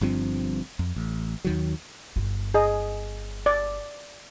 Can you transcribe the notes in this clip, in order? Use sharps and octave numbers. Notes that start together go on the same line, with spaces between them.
G1 G2 F3 C4
F2
A1
D#2 D#3 F#3
G1 F4
G#4 D#5
D5